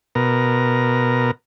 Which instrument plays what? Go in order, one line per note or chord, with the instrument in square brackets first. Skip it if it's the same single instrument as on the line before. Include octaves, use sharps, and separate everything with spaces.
[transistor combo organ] B2 A#4